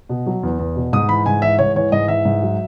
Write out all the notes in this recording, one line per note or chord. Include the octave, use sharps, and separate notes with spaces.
B2
F#3
E2
E2
B2
G#2 D#6
E3 B5
G#2 G#5
E3 E5
G#2 C#5
E3 C#5
G#2 D#5
E3 E5
G#2
F#3